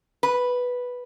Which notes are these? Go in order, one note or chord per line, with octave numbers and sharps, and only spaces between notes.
B4